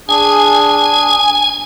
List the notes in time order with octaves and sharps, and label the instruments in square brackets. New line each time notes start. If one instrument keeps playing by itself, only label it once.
[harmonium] D4 G#4 [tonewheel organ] G#5